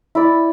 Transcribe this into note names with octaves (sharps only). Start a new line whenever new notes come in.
E4 D5